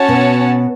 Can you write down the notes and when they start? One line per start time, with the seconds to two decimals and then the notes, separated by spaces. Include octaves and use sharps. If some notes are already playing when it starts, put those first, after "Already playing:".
Already playing: C#4 F#4 C#5 F#5 A5
0.08 B2